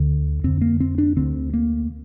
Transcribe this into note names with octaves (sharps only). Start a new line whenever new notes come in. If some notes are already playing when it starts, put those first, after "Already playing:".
Already playing: D2 D3
F2 D3 C4
A#3
C4
D4
D2 D3 C4
A#3